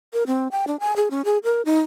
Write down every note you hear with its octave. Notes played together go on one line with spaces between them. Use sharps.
A#4
C4
G5
D4
G#5
G#4
C#4
G#4
A#4
D#4